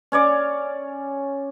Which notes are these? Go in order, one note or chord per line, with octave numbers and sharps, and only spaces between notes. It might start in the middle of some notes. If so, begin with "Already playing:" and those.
C#4 C#5 D5 D6